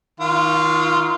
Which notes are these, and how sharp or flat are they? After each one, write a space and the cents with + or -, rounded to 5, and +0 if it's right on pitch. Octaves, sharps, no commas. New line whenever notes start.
D#3 +30 F4 -15 F5 +35